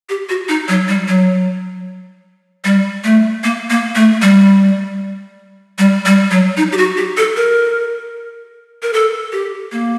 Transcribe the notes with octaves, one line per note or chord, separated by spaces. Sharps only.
G4
F#4
D#4
F#3
G3
F#3
G3
A3
A#3
A#3
A3
G3
G3
G3
F#3
D#4
G4
F#4
G4
A4
A#4
A#4
A4
G4
A#3